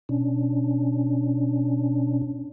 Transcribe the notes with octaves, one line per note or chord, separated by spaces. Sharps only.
B2 C#4 D4